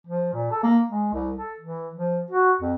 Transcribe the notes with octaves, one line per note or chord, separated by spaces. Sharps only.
F3
A#2
A4
A#3
G#3
C2
A4
E3
F3
F#4
F2